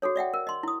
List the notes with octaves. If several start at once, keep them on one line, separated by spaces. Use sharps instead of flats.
F#4 G#4 A4 C#5
D5 E5 F#5 G5
A#4
D#5 C6
E4 D#6